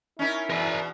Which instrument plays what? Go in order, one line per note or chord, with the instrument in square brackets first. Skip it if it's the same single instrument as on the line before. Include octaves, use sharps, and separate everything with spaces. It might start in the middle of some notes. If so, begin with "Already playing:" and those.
[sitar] C#4 D#4 A#4 [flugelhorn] E4
[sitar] E2 B2 [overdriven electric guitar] A#4 B5